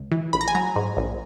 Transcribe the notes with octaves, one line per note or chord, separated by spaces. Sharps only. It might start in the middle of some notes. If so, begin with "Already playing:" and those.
Already playing: C#2
E3
A#1 B5
A#5
G#5
F#3 A#5
G#2
A#1